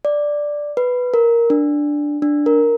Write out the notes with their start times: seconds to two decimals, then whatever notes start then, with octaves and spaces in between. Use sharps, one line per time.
0.05 D5
0.77 B4
1.14 A#4
1.50 D4
2.22 D4
2.46 A#4